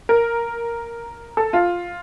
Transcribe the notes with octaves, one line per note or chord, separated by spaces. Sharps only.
A#4
A4
F4